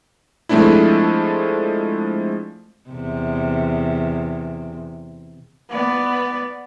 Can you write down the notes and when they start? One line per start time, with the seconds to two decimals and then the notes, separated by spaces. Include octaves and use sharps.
0.49 F3 G#3 A3 C4 D4 E4
2.89 E2 C3
5.70 B3 D5